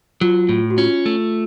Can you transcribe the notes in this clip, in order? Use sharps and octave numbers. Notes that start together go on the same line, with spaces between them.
F#3 F4
A2
F#4
C#4 F4
A3